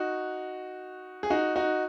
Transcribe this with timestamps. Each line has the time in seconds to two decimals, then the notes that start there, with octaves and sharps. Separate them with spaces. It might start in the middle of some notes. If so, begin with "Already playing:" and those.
Already playing: D#4 F#4
1.23 G#4
1.30 D#4 F#4
1.56 D#4 F#4